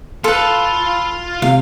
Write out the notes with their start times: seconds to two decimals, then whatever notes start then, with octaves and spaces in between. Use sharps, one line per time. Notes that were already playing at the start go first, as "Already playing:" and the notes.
0.24 F4 A4 B4 F5 C6
1.42 C3 F5